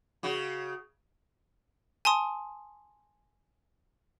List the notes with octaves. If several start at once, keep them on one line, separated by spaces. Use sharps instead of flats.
C#3 F#4
G#5 A5 C6 D#6